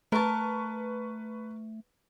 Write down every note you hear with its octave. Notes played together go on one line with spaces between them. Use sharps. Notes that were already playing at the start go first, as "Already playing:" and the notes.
A3 A#4 B4 A5 C#6